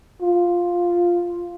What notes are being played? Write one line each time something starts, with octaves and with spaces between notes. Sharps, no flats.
F4